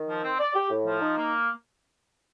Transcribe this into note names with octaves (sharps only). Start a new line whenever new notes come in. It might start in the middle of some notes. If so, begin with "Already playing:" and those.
Already playing: D#3
F3
C4
D5
G4
A2
F3
D#4
A#3